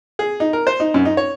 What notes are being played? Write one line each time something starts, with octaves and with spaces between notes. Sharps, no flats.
G#4
D#4
A#4
C5
D#4
F#2
D#4
C#5